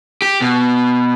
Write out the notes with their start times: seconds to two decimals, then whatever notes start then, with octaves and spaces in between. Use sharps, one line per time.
0.22 G4
0.41 B2